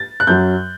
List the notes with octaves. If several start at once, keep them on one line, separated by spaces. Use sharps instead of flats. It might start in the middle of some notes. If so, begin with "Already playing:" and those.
Already playing: A6
F#6
F#2 F#3 G6